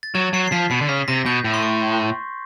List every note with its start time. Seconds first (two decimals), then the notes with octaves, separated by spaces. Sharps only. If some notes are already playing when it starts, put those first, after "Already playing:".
0.03 A6
0.15 F#3 G#6
0.33 F#3 C7
0.48 C7
0.52 F3 B6
0.71 B2 C7
0.81 D3
0.88 C#3 B6
1.08 C3 A#6
1.26 B2 G6
1.44 A2
1.54 C6
1.63 C#6